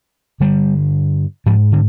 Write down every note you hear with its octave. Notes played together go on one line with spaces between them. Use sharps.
G2 D3 G3
G#2 F3
D3